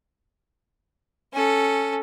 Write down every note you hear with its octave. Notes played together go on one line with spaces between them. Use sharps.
C#4 A4